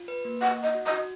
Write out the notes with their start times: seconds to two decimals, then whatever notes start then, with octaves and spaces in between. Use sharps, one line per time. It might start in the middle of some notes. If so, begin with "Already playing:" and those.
Already playing: F4
0.08 B4
0.25 A#3
0.41 D#5 F#5
0.58 D#5 F#5
0.75 F#4
0.86 D#5
0.92 F#4